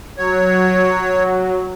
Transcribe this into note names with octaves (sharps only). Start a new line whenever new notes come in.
F#3 C#5